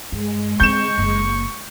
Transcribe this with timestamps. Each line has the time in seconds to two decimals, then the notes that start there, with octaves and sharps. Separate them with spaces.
0.12 G2 G#3
0.60 D3 C4 C#6 G6 E7
0.98 F#1 A#3